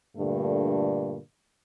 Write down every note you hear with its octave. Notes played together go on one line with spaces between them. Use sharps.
G2 A#2 D3 A3